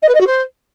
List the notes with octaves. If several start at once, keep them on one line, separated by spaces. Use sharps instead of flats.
D#5
B4
D#5
F#4
C5